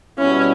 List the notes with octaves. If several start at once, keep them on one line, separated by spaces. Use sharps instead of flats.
B2 G3 B3 C#4 E4